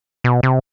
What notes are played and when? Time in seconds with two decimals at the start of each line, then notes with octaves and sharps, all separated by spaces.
0.24 B2
0.43 C3